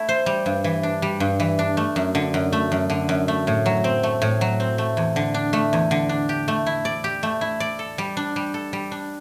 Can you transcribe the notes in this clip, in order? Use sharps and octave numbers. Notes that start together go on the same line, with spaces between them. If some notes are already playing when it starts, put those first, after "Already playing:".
Already playing: A3 E4
C5
G3
G2
E3
D4
G3
G2
E3
D4
A3
F#2
D3
F#2
A3
F#2
D3
F#2
A3
A2
F#3
C4
A3
A2
F#3
C4
A3
E2
D3
D4
A3
E2
D3
D4
G4
A3
E4
D5
G4
A3
E4
D5
A4
G3
D4
G3
A4
G3
D4